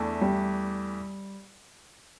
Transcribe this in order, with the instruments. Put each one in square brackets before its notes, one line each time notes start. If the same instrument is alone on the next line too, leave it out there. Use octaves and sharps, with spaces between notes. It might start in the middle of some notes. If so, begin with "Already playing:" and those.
Already playing: [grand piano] E2 E3 A3 D4
[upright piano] G3